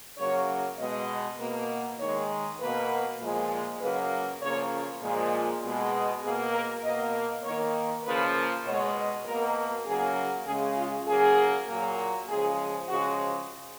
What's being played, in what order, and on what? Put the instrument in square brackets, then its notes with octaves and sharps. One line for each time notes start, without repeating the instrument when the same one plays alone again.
[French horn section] C#3 F#3 A#3 C#5
B2 G#3 D#5
B2 A#3
D#3 G#3 C#5
B2 A#3 B4
A#2 F3 G#3
C#3 F#3 A#3 B4
C#3 F3 A#3 C#5
A#2 F3 G#3
B2 G#3
B2 A#3 G#4
A#4
B2 A#3 D#5
D#3 A#3 C#5
C#3 F3 A#3 B4
B2 G#3 C#5
B2 A#3 A#4
C#3 F#3 A#3 G#4
C#3 G#3 G#4
F4
C#3 F#3 A#3 G#4
A#2 F#3 A#3
C#3 F3 G#3 G#4
C#3 F3 G#3 F#4